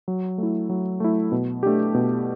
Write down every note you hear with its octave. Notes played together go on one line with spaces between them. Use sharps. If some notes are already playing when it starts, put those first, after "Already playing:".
F#3
A3 E4
F#3
A3 E4
B2
A3 D4 G4
B2